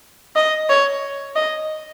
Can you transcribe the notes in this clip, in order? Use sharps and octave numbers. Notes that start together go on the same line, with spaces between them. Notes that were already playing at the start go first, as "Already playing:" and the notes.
D#5
C#5
D#5